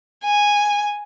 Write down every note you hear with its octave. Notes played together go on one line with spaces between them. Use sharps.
G#5